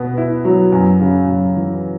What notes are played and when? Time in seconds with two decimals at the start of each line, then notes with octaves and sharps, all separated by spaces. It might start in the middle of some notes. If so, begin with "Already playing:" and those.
Already playing: B2 B3
0.17 E4
0.45 F#3
0.72 F#2
1.01 C#3
1.28 F#2
1.56 E3